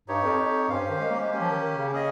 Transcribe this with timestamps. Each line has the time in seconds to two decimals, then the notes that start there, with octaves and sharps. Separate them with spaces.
0.08 G2 D#4 G4 C#5
0.24 F2
0.38 F2
0.69 G2 C#4 G4 C5 F5
0.80 G2
0.89 D#3
1.00 G#3
1.10 A#3
1.20 G#3
1.31 A#3 C#4 G4
1.40 F3
1.51 D#3
1.61 D#3
1.75 C#3
1.91 C#4 G#4 D#5